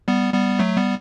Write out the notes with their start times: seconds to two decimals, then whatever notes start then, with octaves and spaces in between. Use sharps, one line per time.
0.08 G3 B3
0.33 G3 B3
0.59 F#3 A3
0.76 G3 B3